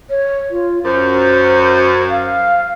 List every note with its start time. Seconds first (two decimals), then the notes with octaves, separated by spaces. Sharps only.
0.10 C#5
0.51 F4
0.84 F#2 C5
2.10 F5